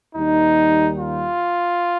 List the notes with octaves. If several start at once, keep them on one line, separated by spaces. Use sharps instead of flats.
D#2 D#3 G3 D#4
F4